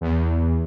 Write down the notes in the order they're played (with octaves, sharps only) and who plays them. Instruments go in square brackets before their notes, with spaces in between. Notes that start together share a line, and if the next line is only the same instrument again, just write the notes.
[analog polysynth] E2